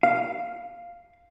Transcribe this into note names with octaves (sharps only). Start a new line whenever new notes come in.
F5